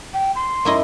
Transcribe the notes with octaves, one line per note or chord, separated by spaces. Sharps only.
G5
C6
F#2 E4 D#5